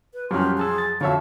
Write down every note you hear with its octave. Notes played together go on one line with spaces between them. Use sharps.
B4
F2 F#3 G3 C#4 G4 C6 F6
G#4 G#5 A5 E6
A6
F2 D3 F#4 C#5 E5 F5 A5